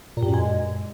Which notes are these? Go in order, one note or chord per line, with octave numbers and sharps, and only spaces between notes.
A#2
G2
F#2
G#3